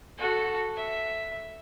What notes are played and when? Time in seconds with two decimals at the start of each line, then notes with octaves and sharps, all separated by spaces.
0.18 F#4 A4
0.76 E5